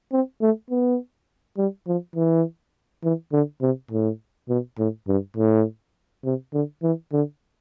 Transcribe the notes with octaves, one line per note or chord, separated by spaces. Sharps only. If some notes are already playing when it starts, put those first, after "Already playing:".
C4
A3
B3
G3
F3
E3
E3
D3
C3
A2
B2
A2
G2
A2
C3
D3
E3
D3